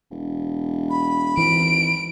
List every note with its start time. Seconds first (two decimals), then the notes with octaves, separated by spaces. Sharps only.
0.11 E1
0.90 B5
1.37 G#1 E3 D7